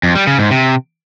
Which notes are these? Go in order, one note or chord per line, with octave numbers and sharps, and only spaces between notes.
F2
G3
C#3
G#2
C3